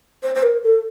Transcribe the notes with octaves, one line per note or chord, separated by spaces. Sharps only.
C5
C5
A#4
A4